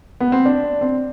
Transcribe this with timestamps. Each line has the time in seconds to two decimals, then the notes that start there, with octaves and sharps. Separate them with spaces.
0.20 B3
0.32 C4
0.46 D4
0.81 C4